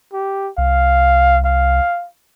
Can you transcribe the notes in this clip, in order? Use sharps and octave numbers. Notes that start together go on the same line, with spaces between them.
G4
C2 F5
F5